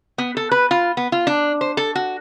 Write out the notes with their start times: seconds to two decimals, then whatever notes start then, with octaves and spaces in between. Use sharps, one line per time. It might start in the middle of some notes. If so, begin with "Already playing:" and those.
0.18 B3
0.37 A4
0.51 B4
0.71 F4
0.97 B3
1.12 F4
1.27 D4
1.61 C5
1.77 A4
1.95 F#4